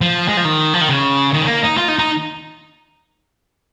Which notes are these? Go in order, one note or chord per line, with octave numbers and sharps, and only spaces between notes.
F3
G#3
F3
D#3
F3
D#3
C#3
D#3
C#4
A#3
D#4
F4
D#4
D#4